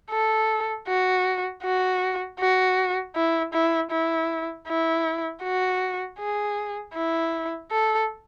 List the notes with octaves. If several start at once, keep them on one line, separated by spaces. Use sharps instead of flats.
A4
F#4
F#4
F#4
E4
E4
E4
E4
F#4
G#4
E4
A4